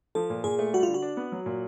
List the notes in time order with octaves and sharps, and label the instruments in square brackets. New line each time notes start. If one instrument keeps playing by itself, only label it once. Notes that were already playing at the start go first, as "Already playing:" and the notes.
[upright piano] F3 [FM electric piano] A4
[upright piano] A#2
[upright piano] A#2 [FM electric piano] G#4
[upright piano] A3
[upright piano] G3 [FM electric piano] F#4
[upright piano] D3 [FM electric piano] F4
[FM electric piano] F#4
[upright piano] D4
B3
F#3
A#2